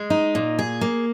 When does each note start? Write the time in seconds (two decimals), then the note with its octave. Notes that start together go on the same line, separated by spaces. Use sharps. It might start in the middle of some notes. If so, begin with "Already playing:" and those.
Already playing: G#3
0.10 D#4
0.35 A#2
0.59 G#4
0.81 A#3